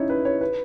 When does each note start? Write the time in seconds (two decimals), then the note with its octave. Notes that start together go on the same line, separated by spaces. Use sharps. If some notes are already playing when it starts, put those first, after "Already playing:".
Already playing: C#4 D#4 E4 C#5
0.10 B4
0.25 C#5
0.41 B4